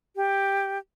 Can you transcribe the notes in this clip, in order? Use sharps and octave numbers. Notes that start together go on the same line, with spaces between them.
G4